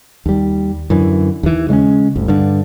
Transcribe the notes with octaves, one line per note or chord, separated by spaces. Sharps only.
D#2 G3
F#2 D3 E3
D#2 E3
C#3 G#3 A#3 C#4
G1 D2
G2 D3